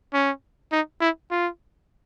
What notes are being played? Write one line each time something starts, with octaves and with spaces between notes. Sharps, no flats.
C#4
D#4
E4
F4